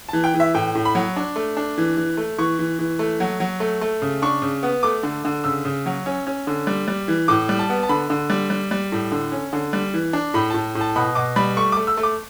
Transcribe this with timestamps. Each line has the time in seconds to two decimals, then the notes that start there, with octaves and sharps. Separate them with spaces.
0.09 E3 A5
0.24 G5
0.34 E3
0.40 E5
0.54 A2 G5
0.75 A2
0.85 B5
0.95 F#3
1.16 D4
1.36 A3
1.57 D4
1.78 E3
1.97 E3
2.17 A3
2.38 E3 C#6
2.59 E3
2.79 E3
2.99 A3
3.20 F#3
3.40 F#3
3.60 A3
3.81 A3
4.02 C#3
4.22 D4 C#6
4.42 C#3
4.63 B3
4.83 A3 D6
5.03 D3
5.25 D3
5.44 C#3 E6
5.65 C#3
5.86 F#3
6.06 C#4
6.27 C#4
6.47 D3
6.67 G3
6.88 G3
7.08 E3
7.28 A2 D6
7.49 G3
7.59 A5
7.70 B3
7.83 A5
7.89 D3 B5
8.10 D3
8.30 G3
8.50 G3
8.71 G3
8.92 A2
9.12 D3
9.32 C#4
9.53 D3
9.73 G3
9.94 E3
10.13 D4
10.34 A2 B5
10.50 A2 A5
10.75 A2
10.81 A5
10.96 B2 B5
11.15 B2 D6
11.36 G3 B5
11.56 A3 C#6
11.72 A3 D6
11.87 E6
11.97 A3
12.03 D6